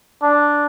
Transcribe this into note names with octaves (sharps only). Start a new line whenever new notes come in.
D4